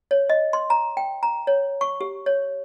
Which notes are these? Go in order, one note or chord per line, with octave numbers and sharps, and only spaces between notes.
C#5
D#5
C6
A#5
G5
A#5
C#5
C#6
G4
C#5